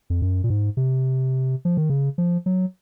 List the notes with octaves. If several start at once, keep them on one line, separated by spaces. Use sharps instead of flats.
F2
F#2
A#2
G#2
C3
F3
D#3
C#3
F3
F#3